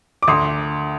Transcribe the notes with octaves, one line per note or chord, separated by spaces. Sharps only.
D6
D2 C6 D#6